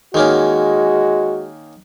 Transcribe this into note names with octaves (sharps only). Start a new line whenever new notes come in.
D#3 G#3 A#3 C#4 F#4